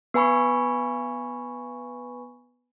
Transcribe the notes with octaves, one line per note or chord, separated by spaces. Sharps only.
B3 B4 G#5 B5 C#6